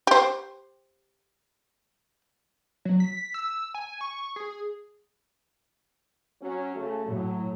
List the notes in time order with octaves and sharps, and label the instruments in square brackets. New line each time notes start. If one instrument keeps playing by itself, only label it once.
[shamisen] G4 C5
[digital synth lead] F#3
B6
E6
G#5
C#6
G#4
[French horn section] F#3 C#4
C#3 A3
[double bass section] A2 [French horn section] F#3